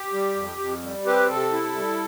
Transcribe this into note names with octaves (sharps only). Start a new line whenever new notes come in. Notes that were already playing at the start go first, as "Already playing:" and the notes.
Already playing: G4
G3
F2
F2
G3
C4 G4 B4
C3 A4
E4
G3